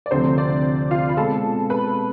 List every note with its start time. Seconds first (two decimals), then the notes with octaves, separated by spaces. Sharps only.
0.06 D5
0.11 D2 C3 F3 A3 C4 C5
0.38 D4 D5
0.91 F4 F5
1.09 B5
1.17 B2 G#3 C4 A4 A5
1.70 B4 B5